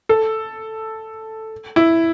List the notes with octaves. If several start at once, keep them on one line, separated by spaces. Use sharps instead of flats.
A4
E4